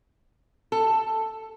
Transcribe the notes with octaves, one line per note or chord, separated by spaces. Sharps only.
A4